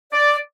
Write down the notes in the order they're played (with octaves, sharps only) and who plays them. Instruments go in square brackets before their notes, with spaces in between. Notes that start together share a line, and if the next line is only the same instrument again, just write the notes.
[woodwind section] D5